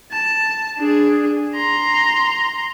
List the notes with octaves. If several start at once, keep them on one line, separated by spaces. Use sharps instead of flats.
A5
D4 G#4
A#5 C6